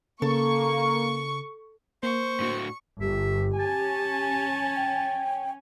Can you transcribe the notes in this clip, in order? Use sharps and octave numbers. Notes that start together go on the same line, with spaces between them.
C#3 A#3 A4 C#6
A#3 C5 C#6
A2 D4 F#4
G1 G4 E5
C#4 G#5 A5
G5